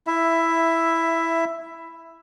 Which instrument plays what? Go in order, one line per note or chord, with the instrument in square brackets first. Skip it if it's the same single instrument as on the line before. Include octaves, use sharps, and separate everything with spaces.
[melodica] E4 E5